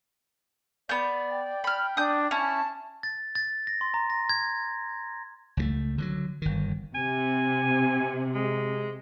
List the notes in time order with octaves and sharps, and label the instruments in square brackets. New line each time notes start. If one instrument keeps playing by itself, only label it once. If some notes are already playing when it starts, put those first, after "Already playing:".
[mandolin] B3 G6 [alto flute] D5
[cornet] G5
[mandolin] B5 F6
[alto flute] D4 [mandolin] D#6 G6
[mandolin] C#4 E4 [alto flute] A5
[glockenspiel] A6
A6
A#6
C6
A#5
A#6
G#6
[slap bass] C#2 F3 A3
D3 F3 F#3
G1 D#3
[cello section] C3 [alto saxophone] G#5
[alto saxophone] G#3